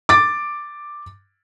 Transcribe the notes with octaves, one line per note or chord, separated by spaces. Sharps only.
D6 A6